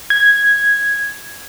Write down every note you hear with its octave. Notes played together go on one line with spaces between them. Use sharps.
G#6